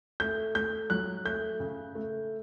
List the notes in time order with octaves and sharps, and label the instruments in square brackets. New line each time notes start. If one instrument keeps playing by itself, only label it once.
[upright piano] A3 G6
A3 G6
F#3 F#6
A3 G6
C#3
A3